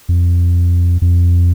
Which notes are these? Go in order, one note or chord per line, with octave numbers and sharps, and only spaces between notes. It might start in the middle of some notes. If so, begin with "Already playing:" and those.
F2
F2